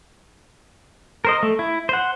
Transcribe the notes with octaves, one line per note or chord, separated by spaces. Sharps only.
A#4 C5 D#5
A3
E4
C5 F#5